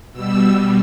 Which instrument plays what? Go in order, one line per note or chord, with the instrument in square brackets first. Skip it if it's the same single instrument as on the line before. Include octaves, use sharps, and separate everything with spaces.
[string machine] B2 G3 E6